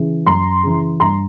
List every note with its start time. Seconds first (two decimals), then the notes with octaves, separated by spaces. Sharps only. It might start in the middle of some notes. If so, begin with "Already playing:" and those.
Already playing: C#3 E3
0.26 F#2 A#5 C6
0.63 C#3 E3
1.00 G2 A#5 C6